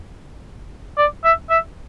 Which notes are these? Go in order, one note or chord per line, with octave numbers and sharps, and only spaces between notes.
D5
E5
E5